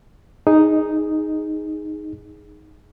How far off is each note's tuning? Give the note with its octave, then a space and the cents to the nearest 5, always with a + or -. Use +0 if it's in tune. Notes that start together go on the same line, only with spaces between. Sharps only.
D#4 +0 G#4 +0